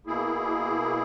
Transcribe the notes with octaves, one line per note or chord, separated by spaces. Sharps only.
B2 A#3 E4 G#4